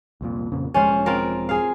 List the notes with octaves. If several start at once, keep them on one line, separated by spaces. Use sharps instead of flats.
C2 F2 A#2
F2 A#2 C#3
E1 F3 G#3 C#4 F4 C5
C4 F4 A#4
G#4 F5